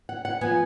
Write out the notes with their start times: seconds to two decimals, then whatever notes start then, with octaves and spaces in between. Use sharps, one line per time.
0.09 F#5
0.25 F#5
0.41 F3 B3 G#5